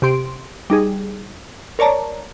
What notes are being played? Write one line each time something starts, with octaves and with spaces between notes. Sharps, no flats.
C3 G4 C6 D7
G3 D#4 G#4
A#4 C#5 D5 A5 A#5